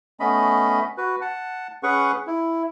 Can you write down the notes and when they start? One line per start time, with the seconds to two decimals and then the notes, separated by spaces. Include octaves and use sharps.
0.20 A3 B3 C#4 D#5 B5
0.98 F#4 B4
1.21 F#5 A5
1.83 C#4 G#4 B4 F#5 C#6
2.27 E4